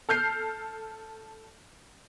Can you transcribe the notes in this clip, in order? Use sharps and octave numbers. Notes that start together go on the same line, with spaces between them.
A4 F6 G6 C7